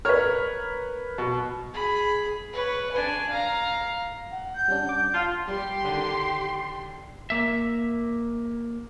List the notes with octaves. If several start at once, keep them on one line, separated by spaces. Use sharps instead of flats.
A#4 B4 C#5 F6
B2
G#4 B5
B4 C#5
D4 G#5
F5 A#5
F#5
G6
G3 C#4 D4
D6
F4 A5
G3 G4 C6
D3 D#3
A#3 E5